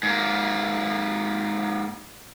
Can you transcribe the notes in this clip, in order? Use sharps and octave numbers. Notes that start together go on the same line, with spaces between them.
G#2 A#3